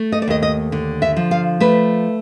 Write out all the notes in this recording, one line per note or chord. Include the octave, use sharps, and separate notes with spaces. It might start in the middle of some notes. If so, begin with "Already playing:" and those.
Already playing: A3
D#5
D5
D#2 D#5
D#5
D3
E5
F3
F5
A3 B4